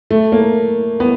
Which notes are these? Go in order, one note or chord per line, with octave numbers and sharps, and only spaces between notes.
A3
A#3
B3